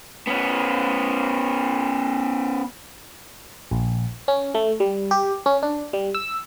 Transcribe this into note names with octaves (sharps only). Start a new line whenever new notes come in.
B3 C#4
A#1
C#4
A3
G3
G4
C#4
D4
G3
E6